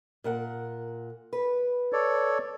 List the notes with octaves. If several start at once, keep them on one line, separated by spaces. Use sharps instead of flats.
A#2 A#4 F#5
B4
A4 C#5 D5